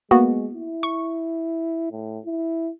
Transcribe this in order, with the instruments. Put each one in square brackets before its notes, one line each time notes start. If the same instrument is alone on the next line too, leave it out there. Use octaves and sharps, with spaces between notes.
[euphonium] G#3 [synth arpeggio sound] A#3 B3 F#4
[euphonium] E4
[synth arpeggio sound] C#6
[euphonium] A2
E4